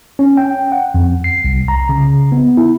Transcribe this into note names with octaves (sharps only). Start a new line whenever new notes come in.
C#4
G5
F#5
F2
C7
C2
A#5
C#3
B3
E4